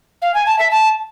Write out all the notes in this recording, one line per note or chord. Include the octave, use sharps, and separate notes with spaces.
F5
G#5
A5
E5
A5